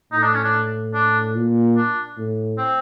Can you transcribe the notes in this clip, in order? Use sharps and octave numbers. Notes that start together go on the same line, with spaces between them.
A2 D#4
D4
C#4
D4
D4
A#2
D4
A2
C4